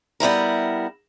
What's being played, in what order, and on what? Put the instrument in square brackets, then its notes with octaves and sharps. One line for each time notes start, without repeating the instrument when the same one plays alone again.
[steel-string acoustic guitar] G3 B3 E4 A#4